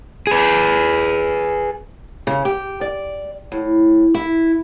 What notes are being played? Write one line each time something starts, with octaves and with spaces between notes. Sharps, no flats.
G#4 B4
C#3
G4
D5
A2
E4